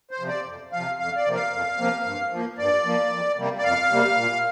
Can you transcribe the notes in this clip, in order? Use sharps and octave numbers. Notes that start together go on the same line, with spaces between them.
C5
C3 F3
D5
F2
C3 F3 F5
F2 F5
D5
C3 F3 A#3
F5
F2
C3 F3 A#3
G2
F3 A#3
G2 D5
F3 A#3
F2
C3 G3 A#3
D5
F2 F5
C3 G3 A#3
A#2